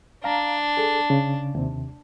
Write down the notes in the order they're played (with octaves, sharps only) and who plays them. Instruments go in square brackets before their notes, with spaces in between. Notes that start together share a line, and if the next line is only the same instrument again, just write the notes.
[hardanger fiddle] D4 [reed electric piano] F5 A#5
[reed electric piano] G#4 A4
C#3
D#2 C3